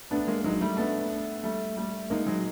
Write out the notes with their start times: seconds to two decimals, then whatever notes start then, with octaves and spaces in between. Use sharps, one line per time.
0.11 A3 B3 D4
0.28 G#3 A#3
0.44 F#3 G#3 D#4
0.61 G3 A3
0.77 A3 B3 D4
1.43 G3 A3
1.77 G3 A3
2.10 G#3 A#3 D#4
2.27 F#3 G#3